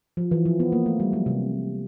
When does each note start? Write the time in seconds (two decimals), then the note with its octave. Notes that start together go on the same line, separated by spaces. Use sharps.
0.17 F3
0.31 E3
0.46 F3
0.60 B3
0.72 A#3
0.86 A3
1.00 G3
1.13 F#3
1.26 C3